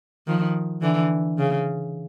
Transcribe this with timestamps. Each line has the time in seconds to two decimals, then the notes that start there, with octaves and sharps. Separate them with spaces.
0.27 D#3 F3
0.82 D3 E3
1.38 C#3